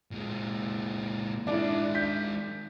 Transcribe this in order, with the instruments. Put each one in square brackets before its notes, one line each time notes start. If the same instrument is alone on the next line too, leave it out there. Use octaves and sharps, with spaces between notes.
[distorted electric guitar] A#2 G#3
[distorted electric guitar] D#3 G#3 [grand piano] D4 E4
[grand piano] G6 B6